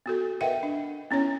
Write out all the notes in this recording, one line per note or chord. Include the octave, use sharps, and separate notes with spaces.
B3 F#4 A4
A#4 B4 D#5 E5 F#5 G5
D4
B3 C#4 E4 C#5